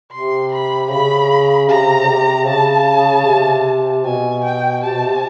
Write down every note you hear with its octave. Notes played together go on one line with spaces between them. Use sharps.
C3 C6
B5
C#3 B5
C3 A#5
C#3
C3
C#3 A5
C3
B2 G#5
G5
C3 A5
B2
C3